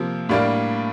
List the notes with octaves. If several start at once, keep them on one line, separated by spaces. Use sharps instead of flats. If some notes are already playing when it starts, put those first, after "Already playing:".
Already playing: C3 F3 A#3
A2 G3 A#3 D4